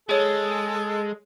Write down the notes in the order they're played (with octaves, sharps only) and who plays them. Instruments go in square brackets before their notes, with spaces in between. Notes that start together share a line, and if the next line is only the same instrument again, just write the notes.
[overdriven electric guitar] G#3 [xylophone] G#4 C#5 [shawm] A4